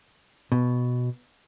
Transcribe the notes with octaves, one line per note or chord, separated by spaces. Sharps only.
B2